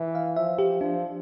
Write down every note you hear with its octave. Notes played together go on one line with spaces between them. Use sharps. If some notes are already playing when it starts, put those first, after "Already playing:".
Already playing: E3
F5
F3 E5
G4
F3 D4